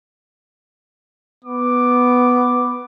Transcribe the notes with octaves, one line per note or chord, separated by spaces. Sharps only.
B3 D6